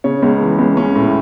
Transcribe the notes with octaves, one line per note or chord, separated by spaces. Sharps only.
C#3 C#5
C#2
E3
C#2
C#4
A2